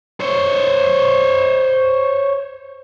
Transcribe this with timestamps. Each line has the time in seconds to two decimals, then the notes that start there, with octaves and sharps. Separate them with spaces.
0.20 C5 C#5